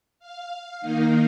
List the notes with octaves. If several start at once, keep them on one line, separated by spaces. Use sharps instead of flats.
F5
D#3 A#3 D#4